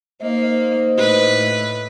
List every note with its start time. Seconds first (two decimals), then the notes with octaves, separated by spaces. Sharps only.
0.22 A#3 D#4 C5 D#5
0.98 A2 B4